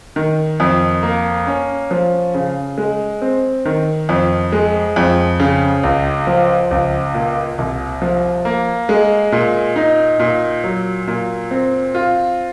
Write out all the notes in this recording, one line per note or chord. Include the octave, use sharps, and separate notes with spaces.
D#3
F2
A#3
C#4
F3
C#3
G#3
C4
D#3
F2
G#3
F2
C#3
C#2
F3
C#2
A#2
C2
F3
A#3
G#3
A#2
D#4
A#2
F#3
A#2
C4
F4